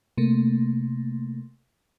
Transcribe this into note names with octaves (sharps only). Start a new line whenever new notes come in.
C3 A3 A#3